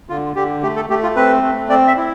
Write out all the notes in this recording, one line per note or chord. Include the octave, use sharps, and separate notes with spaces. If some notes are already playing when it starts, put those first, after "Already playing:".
D3 F4
D3 G4
A3 G4
A4
A3 G4
F4
C4 B4
A3
C4 D5
E5
E4